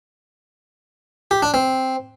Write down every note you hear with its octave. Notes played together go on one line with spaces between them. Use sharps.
G4
D4
C4